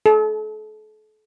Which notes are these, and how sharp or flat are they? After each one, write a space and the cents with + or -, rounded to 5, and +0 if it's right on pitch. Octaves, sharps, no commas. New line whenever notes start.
A4 -40